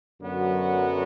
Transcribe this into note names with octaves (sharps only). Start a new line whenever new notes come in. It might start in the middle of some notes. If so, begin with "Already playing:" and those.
F#2 D3 F#3 B3 F#4